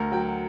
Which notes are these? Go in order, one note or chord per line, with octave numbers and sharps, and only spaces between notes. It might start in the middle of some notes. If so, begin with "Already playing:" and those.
Already playing: D2 A#4
F#3 G5